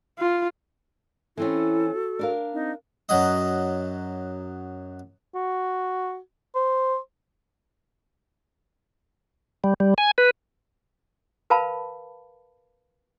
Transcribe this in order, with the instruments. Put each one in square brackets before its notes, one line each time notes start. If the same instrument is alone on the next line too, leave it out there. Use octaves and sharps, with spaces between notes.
[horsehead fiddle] F4
[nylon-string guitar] E3 C4 C#4 [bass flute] E4 [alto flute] A4
[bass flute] F#4
[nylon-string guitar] D4 A#4 F5
[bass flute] C4 [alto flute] D#4
[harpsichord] F#2 F#3 D#5
[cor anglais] F#4
C5
[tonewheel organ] G3
G3
G#5
B4
[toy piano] A#4 B4 F5 A5 B5